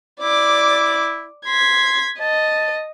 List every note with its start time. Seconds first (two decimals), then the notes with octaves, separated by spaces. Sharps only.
0.21 E4 D5 D6
1.46 C6 G#6 B6
2.20 D#5 A5